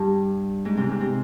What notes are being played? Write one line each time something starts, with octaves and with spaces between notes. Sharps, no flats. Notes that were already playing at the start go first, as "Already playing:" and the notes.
Already playing: G2 G3
G#2 G#3
C3 C4
C3 C4
C3 C4